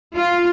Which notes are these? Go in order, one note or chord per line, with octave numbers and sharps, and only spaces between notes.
F4